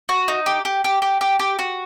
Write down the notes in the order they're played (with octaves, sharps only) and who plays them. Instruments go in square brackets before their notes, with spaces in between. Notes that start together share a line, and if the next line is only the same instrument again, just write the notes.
[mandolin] F#4
D#4
G4
G4
G4
G4
G4
G4
F#4